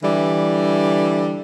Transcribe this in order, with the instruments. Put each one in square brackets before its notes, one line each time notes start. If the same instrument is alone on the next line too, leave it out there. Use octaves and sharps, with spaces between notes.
[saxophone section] D3 E3 G3